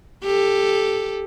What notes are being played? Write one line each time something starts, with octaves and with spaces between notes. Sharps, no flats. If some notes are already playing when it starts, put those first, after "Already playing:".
G4 A4